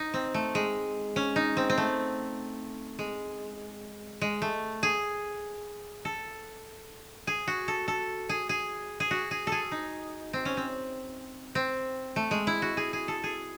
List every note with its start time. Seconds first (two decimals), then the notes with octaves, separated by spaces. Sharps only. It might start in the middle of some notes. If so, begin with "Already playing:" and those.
Already playing: D#4
0.14 C4
0.34 A3
0.55 G#3
1.16 C#4
1.36 D#4
1.57 C4
1.70 C4
1.78 A3
2.99 G#3
4.21 G#3
4.42 A3
4.83 G#4
6.05 A4
7.27 G#4
7.48 F#4
7.68 A4
7.88 A4
8.29 G#4
8.49 G#4
9.00 G#4
9.11 F#4
9.31 G#4
9.47 G#4 A4
9.72 D#4
10.33 C4
10.45 C#4
10.57 C4
11.55 C4
12.16 A3
12.31 G#3
12.47 E4
12.62 F#4
12.77 G#4
12.93 G#4
13.08 A4
13.24 G#4